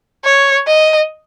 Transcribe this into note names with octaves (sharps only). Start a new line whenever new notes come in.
C#5
D#5